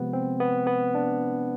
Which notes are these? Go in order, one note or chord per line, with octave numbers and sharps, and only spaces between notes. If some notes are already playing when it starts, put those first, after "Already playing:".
Already playing: C3 F3 G#3 B3
C4
B3
B3
D4